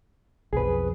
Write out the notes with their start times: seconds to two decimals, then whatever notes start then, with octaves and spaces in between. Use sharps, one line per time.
0.53 B1 F2 G#4 B4